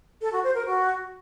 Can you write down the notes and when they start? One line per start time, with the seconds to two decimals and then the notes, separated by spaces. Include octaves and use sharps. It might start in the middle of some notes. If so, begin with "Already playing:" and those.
0.21 A4
0.32 F#4
0.44 C5
0.55 A#4
0.66 F#4